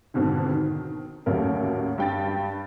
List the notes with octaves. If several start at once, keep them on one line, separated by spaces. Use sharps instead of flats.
F2 G#2 B2 D3 D#3
D#3
A1 D#2 F#3 A3 A#4
G2 G5 A6